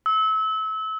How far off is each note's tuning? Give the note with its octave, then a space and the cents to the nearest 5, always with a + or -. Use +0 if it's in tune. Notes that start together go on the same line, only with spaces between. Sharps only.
E6 -30